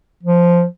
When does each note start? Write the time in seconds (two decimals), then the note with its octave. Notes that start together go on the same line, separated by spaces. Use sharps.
0.23 F3